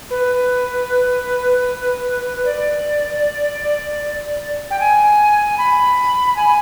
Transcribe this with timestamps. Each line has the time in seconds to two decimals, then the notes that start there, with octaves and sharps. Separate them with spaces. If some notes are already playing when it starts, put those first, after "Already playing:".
0.11 B4
2.45 D5
4.71 G5
4.80 G#5
5.58 B5
6.36 G#5